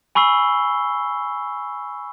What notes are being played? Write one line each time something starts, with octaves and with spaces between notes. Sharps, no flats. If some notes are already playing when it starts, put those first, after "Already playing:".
G#5 B5 C#6 E6 C7 G7